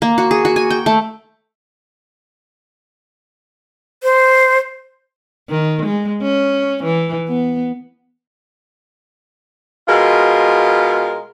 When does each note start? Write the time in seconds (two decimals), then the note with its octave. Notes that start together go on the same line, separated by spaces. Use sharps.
0.02 A#3
0.18 F#4
0.31 G#4
0.45 F#4
0.56 G#5
0.70 G5
0.86 A3
4.03 C5
5.50 D#3
5.86 G#3
6.22 C#4
6.84 E3
7.28 B3
9.88 B2 G#3 F4 A#4